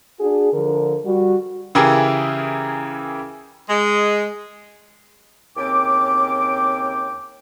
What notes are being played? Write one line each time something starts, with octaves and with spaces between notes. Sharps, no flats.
D4 F#4 G#4
D3 F3 A#4
G3 F#4
C#3 E3 E4 G4 G#4 A#4
G#3
D#2 C#3 C4 G5 D6